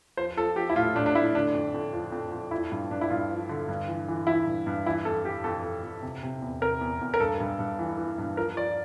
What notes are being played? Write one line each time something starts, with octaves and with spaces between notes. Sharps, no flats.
F3 C5
F3 A4
F3 G4
E4
A2 F4
A2 D4
D4
A2 E4
D3 D4
F2
F2
F3
F2
F2
F3 E4
G2
G2 D4
E4
G2 F4
F3
D3
G2
E3
E3
E3 E4
G2
G2
E3 E4
F2 A4
E3 G4
F2 A4
F2
F2
C3
C3
E2
C3 A#4
E2
E2
A#4
G2 A4
G2
G2
E3
E3
G2
F3 A#4
F3 D5